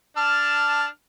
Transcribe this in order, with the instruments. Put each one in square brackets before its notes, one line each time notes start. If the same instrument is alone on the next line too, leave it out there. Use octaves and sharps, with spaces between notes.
[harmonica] D4 A5 F6